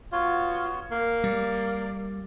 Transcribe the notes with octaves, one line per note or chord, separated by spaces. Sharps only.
B3 F4 F#4 C#5
A#3
G3 D5